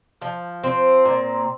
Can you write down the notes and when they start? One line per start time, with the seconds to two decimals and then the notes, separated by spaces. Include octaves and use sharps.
0.22 F3
0.64 C4
1.05 A#2